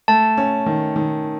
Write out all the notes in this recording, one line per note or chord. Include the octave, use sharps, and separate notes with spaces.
A3 A5
C#4
D#3
D#3